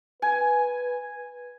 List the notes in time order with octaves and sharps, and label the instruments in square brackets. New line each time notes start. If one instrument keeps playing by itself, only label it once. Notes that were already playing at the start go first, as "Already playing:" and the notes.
[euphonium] B4 [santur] G#5